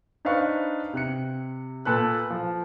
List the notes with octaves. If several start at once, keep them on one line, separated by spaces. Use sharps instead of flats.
D4 D#4 B4 C5 F5 C#6
C3 F#6 C#7
A#2 A4 B4 F#6
F3